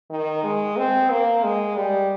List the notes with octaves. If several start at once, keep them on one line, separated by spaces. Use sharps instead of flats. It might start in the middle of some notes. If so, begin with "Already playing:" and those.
D#3
G#3
C4
A#3
G#3
G3